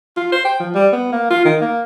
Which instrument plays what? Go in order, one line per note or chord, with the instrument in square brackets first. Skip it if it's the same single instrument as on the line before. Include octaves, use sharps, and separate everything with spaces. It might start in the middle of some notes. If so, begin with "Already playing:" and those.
[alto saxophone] F4
C5
G5
F3
G3
B3
A#3
F4
D#3
A#3